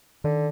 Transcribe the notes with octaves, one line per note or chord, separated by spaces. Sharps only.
D3 D#3